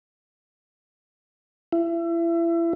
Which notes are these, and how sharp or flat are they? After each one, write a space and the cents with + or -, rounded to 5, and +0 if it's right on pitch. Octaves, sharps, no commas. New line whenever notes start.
E4 +30